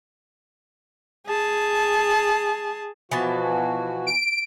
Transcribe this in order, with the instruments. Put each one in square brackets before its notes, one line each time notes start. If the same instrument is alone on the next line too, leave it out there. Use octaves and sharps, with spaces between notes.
[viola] G#4 A5
[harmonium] B2 F3 F#4 [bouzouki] E3 B3 A5
[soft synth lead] D7